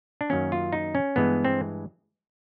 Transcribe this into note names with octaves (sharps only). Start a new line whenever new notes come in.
D4
F#2 D#3 F#3 A#3 C#4
F4
D#4
C#4
G2 E3 G#3 B3
C4